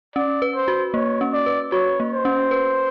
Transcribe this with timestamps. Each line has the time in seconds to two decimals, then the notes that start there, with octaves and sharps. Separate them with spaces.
0.16 C#4 D5
0.42 B4
0.55 C5
0.68 F#4
0.94 A#3 C#5
1.21 C#4
1.33 D5
1.46 B4
1.72 F#4 C#5
2.00 A#3
2.12 C5
2.25 C#4
2.51 B4